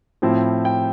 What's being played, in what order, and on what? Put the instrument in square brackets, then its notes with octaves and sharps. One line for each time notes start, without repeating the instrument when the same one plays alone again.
[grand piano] A2 F3 C4 E4
G5